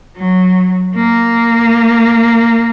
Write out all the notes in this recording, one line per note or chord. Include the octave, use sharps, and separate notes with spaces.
F#3
A#3